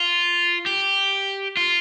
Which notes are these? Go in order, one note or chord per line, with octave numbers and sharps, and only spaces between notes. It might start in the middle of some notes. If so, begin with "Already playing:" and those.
Already playing: F4
G4
F4